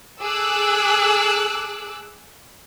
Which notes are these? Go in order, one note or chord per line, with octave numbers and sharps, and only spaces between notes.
G#4 A4 D6 E6 F#6